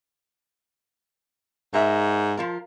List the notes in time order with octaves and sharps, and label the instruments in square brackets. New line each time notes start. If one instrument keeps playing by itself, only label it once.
[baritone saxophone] G#2 [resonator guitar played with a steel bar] A#4 E5
[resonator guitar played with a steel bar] F3 F4 A#4